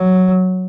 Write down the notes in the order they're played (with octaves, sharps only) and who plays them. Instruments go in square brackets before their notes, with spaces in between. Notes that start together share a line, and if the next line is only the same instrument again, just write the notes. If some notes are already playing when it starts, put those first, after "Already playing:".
Already playing: [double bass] F#3